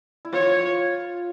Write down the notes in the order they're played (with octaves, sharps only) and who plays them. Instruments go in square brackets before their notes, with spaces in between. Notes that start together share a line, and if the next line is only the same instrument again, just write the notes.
[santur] E4
[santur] F4 [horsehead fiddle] C#5